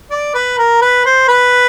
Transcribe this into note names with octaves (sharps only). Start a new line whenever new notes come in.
D5
B4
A#4
B4
C5
B4